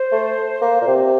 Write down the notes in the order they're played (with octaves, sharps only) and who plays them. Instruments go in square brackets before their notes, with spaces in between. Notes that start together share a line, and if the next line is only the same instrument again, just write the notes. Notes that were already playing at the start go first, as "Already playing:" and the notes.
Already playing: [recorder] C5
[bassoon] A3
A#3
A#2
C3